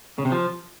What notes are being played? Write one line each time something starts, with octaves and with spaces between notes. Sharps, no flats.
C#3
C3
F3